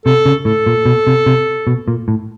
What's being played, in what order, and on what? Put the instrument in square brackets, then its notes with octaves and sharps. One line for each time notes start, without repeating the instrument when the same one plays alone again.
[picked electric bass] C3 [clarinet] A4
[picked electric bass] C#3
[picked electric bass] A2 [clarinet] A4
[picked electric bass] A#2
B2
C3
C3
B2
A#2
A2